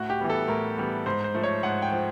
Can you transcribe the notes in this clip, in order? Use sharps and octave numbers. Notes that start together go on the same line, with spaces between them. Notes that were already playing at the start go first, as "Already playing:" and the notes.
Already playing: A2 F#4
G4
E3 G3 B3
A4
A2 A#4
E3 G3 B3
G#2 C5
C5
F3 A3
C#5
G#2 F#5
G5
F3